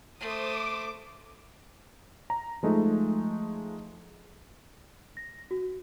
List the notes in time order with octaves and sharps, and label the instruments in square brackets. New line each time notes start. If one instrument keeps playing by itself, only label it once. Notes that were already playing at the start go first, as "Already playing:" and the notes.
[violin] A3 [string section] C5 D#6 [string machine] D6
[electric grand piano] A#5
F3 G#3 A3 D#4
[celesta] A#6
F#4